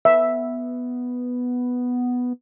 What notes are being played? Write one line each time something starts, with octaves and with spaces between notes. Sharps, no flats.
B3 E5